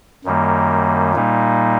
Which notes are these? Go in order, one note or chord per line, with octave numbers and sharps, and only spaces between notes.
F#2 D#3 G3 A#3
A#2 G3 A#3 D#4